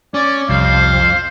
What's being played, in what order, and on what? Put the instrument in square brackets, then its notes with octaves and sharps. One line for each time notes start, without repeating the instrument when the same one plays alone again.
[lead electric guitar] C#4 [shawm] D5
[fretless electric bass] C2 [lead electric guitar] F2 [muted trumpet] C5 [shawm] F5